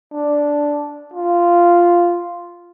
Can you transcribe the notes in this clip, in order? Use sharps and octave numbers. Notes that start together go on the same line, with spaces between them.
D4
F4